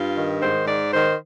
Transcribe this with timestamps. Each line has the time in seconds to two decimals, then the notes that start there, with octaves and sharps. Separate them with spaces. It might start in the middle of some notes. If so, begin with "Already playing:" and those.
Already playing: G2 F4
0.16 D#3
0.41 G#2 C5
0.67 G#2 D5
0.92 D#3 C5